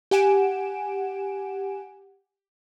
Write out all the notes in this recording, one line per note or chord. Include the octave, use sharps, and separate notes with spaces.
G4 F#5 G#5 D7 E7